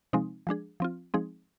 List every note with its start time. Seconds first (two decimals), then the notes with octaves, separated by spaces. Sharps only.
0.13 C3 F3 G#3 C4 D#4
0.47 F3 G#3 D4 G#4
0.80 F3 C4 F4
1.14 F3 G#3 C4 D#4 G#4